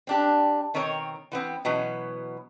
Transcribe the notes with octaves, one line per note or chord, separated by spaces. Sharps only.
C4 D4 G4
B2 D#3 C4 A#4 C#5
E3 B3 C4
B2 E3 F#3 B3 C#4